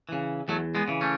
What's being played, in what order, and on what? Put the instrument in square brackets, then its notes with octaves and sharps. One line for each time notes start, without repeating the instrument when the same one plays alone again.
[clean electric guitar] C#3 E3
E2 F#3 A3
G#3 B3
C#3 E3
A3 C#4